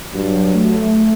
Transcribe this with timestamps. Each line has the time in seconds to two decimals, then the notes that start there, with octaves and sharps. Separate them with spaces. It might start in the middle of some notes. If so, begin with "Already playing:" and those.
0.14 G2 F#3
0.54 A3